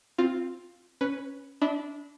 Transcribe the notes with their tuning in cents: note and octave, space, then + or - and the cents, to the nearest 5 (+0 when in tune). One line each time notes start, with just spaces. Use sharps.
C4 +0 F4 +5
C#4 +0 B4 +0
D4 -15 E5 -45 B5 +0